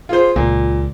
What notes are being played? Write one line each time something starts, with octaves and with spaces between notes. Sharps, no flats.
F4 G#4 C5
C#2 A#2